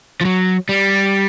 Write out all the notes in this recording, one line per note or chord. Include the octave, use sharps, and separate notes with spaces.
F3
F#3
G3